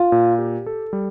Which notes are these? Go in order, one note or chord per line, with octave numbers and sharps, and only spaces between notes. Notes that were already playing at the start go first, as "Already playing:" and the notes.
Already playing: F4
A#2
G4
A4
G3